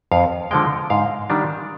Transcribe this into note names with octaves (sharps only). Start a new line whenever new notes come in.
F2 F5
D3 F3 G#3 G5
G#2 F5
D#3 G3 D4